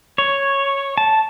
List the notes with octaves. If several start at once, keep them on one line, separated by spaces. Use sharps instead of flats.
C#5
A5